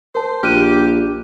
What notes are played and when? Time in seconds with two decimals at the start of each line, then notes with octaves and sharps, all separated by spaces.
0.15 A#4 C5 A5
0.43 A#1 G4 F6 F#6 D#7